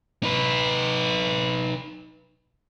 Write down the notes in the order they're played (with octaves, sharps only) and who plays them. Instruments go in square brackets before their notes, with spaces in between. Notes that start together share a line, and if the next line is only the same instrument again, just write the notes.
[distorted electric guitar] D#4 B4